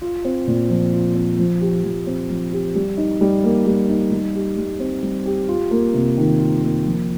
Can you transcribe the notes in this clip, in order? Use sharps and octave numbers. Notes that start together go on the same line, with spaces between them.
F4
C4
A#2
F3
F4
C4
F3
G4
F3
C4
F3
G4
G3
D#4
G3
A#3
G3
D#4
G3
G4
G3
C4
G3
G4
F4
A#3
C3
D#3
F4
A#3
F3